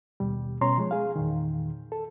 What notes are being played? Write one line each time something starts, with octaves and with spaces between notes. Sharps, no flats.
D#2 B2 G3
B2 C#4 C#5 A#5 C6
F3 G#3
G#4 F5
E2 A#2 D#3
A4